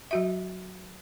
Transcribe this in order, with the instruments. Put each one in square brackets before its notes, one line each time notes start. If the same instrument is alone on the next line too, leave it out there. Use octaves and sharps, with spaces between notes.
[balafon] F#3 F#4 E5